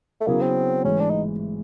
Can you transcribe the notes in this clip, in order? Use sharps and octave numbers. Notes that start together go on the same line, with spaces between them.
A3
C#3 F#3 A#3 B3 E4 G#4
C4
A1 G#2 E3 G#3 C#4
D4
D#4